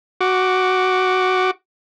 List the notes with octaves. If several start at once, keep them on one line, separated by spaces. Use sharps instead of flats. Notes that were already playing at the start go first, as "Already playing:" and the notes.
F#4 D6